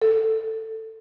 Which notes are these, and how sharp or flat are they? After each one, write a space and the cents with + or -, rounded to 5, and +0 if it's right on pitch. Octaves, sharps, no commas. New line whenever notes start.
A4 +10